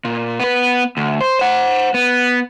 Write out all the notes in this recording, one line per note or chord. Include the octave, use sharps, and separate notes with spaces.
A#2
B3 B4
D2
C5
C5 F#5
B3